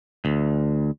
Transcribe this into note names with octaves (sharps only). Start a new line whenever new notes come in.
D2